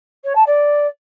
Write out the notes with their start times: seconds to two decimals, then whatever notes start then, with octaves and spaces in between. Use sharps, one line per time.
0.24 C#5
0.35 A5
0.46 D5